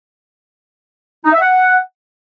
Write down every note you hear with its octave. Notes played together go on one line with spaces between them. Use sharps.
D#4
E5
F#5